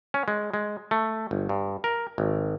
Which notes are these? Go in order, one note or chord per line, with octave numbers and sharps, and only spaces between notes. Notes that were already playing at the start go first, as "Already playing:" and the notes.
C#4
G#3
G#3
A3
G1
G2
A#4
G#1